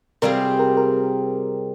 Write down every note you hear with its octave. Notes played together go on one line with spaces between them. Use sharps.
C3 G3 C4 F4 G#4 A#4
A#4
A#4